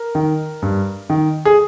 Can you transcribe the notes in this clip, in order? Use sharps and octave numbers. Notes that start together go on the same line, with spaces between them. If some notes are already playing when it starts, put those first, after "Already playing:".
Already playing: A#4
D#3
G2
D#3
G#4